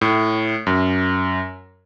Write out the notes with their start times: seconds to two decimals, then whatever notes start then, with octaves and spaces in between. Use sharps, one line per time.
0.01 A2
0.67 F#2